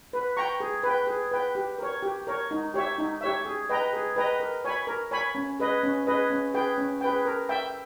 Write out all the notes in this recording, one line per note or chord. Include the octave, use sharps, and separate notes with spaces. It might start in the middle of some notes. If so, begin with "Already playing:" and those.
B4
G5 A#5 C#6
G#4
B4 G5
G#4
B4 G5
G4
A#4 C#5
G4
A#4 C#5
D#4
G4 C#5 E5
D#4
G4 C#5 E5
G#4
B4 D#5 G5 A#5
G#4
B4 D#5 G5 A#5
A#4
C#5 G#5 B5
A#4
C#5 G#5 B5
C#4
G#4 B4 D#5
C#4
G#4 B4 D#5
C#4
G#4 B4 G5
C#4
G#4 B4 G5
A#4
E5 G5